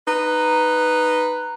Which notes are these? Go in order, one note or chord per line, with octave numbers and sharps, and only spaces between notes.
D#4 B4